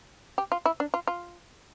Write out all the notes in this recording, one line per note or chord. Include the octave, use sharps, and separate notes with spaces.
G4
F4
E4
D4
F4
F4